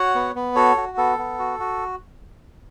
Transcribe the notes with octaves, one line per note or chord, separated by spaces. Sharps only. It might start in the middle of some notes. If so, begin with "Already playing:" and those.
Already playing: F#4 C#5 F#5
B3
B3
F#4 A4 C#5
F#4
B3 A4
B3
F#4
F#4